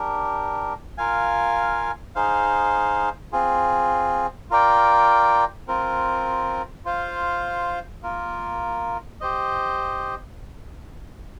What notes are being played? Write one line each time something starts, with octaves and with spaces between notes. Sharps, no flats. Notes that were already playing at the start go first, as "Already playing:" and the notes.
Already playing: D4 G4 A#4
F4 A#4 F5 G#5
D#4 G#4 C5 F5
C4 F4 G#4
F4 A#4 D5 G5
C4 F4 A#4
F4 C5 F5
A#3 F4 A#4
G4 C5 D#5